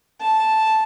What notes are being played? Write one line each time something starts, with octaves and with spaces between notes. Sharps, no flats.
A5